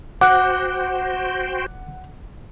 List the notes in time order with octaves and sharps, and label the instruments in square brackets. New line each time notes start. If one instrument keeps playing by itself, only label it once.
[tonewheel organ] F#4 C5 G5 [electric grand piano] F#5 [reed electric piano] D6 F#6